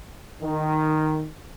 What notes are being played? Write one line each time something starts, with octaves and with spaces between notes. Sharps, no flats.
D#3